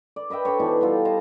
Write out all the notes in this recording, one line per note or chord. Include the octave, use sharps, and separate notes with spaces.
D5
B4 D#5 E5 G5
D4 A4 C5 C#5
B2 E3 D#4 D5
G3 B3 F4 A4
C5 D#5 A5 A#5